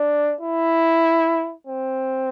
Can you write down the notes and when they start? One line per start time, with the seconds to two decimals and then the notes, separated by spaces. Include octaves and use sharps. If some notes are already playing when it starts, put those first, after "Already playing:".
Already playing: D4
0.42 E4
1.67 C4